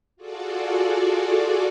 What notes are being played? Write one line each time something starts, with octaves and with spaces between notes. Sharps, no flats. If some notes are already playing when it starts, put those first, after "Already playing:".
F4 F#4 G#4 A4 D5